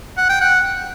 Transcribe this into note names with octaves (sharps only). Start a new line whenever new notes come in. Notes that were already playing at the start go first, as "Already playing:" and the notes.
F#5
G5
F#5